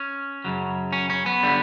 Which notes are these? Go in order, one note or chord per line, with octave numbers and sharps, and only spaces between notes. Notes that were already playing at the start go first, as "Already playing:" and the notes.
Already playing: C#4
F#2 C#3 F#3
C#4
C#4
B3
D3 G3